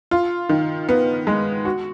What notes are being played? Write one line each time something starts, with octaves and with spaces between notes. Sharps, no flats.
F4
D#3
B3
G#3
F#4